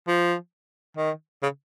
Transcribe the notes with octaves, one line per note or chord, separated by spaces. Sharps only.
F3
D#3
C#3